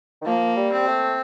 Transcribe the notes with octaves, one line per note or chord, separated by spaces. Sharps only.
D#3
F3 A#3
G3
C4
A3